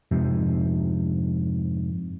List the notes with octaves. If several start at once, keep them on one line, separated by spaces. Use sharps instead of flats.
F2 G#2 C3